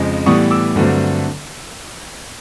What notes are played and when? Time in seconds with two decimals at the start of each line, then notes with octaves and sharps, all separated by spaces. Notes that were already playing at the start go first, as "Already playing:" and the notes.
Already playing: F2 C#3 G#3 C4
0.26 A2 E3 G3 B3 C#6 D#6
0.51 D6 E6
0.76 G2 D3 F#3 A3 C4